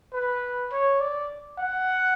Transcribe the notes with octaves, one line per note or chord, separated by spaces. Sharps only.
B4
C#5
D5
F#5